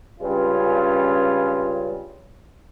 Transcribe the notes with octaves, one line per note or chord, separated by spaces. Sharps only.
C#2 G2 C#4 F4